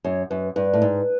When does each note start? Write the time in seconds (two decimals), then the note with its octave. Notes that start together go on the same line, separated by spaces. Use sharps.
0.04 F#2 C#5
0.30 F#2 B4
0.56 G2 B4
0.74 A2
0.82 G#2